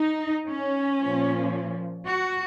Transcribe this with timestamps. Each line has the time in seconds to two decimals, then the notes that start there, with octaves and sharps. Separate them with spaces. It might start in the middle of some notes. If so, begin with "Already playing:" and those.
Already playing: D#4
0.48 C#4
1.00 A#2 F3
2.07 F#4